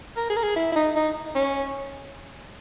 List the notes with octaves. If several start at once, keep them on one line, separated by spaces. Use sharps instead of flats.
A#4
G#4
A#4
G#4
E4
E4
D#4
D#4
C#4